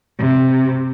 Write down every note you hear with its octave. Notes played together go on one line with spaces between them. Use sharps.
C3